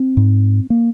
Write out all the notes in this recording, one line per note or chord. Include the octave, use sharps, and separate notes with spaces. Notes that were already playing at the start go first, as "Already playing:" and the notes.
Already playing: C4
G#2
A#3